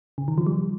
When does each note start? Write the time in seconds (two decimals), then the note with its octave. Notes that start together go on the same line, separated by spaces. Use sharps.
0.18 C#3
0.28 D#3
0.38 F3
0.46 G3